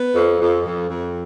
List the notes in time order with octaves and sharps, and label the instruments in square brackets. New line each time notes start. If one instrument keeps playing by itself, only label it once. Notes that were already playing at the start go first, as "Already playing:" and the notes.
Already playing: [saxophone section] B3
F2
F2
F2
F2